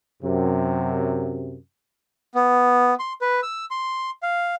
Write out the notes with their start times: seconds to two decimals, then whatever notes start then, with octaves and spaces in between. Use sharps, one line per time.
0.23 F#2 C3
2.35 B3
2.99 C6
3.21 B4
3.43 E6
3.71 C6
4.23 F5